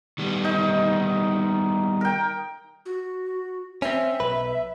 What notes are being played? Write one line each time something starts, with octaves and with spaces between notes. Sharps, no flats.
D#3 G3 B3
D#4
A#4 G5
F#4
C4 C#4 E5
B1 B4